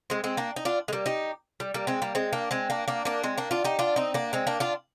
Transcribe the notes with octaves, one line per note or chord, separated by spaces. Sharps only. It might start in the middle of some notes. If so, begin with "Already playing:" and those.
G#3 C4
G#3 C4
A#3 D4
D#4
D4 F4
G#3
G3 A#3
D#4 G4
G3
G3 A#3
G#3 C4
G3 A#3
G#3 C4
A#3 D4
G#3 C4
A#3 D4
A#3 D4
A#3 D4
G#3 C4
A#3 D4
D4 F4
D#4 G4
D4 F4
C4 D#4
A#3 D4
G#3 C4
A#3 D4
D4 F4